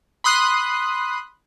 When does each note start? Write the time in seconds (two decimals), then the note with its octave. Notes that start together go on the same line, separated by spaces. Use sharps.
0.24 B5 C6 D#6 F#6 C7